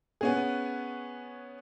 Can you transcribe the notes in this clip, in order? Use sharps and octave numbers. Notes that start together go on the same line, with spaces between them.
B3 C#4 G#4